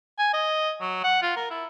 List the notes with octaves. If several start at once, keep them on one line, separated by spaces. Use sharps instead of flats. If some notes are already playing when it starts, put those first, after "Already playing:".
G#5
D#5
F#3
F#5
F4
A#4
E4